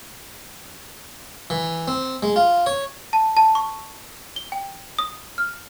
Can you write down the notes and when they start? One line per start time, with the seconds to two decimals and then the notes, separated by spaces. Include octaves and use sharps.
1.50 E3
1.88 C4
2.23 G#3
2.36 F4
2.66 C#5
3.13 A5
3.37 A5
3.55 C#6
4.36 G7
4.52 G5
4.99 D#6
5.38 F6